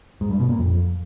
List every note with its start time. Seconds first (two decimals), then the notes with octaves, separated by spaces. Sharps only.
0.21 G#2
0.30 G2
0.40 B2
0.49 A#2
0.59 F2